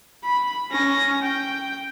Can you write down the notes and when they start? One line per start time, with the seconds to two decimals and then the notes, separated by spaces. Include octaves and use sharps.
0.24 B5
0.71 C#4 A#6
1.22 G5